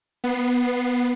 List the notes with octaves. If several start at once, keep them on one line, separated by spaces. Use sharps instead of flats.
B3 C7